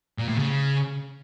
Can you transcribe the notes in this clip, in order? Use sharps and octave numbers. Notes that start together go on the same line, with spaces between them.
A#2
A2
C#3